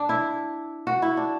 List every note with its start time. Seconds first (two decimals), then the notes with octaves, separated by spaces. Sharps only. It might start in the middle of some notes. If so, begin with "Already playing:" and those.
Already playing: D4
0.09 E4
0.87 F#4
1.02 E4
1.17 D4